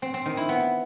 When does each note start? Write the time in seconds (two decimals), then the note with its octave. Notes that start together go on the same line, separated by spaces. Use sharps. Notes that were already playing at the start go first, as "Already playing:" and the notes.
0.02 C4
0.14 C4
0.26 D#3
0.37 E4
0.49 B3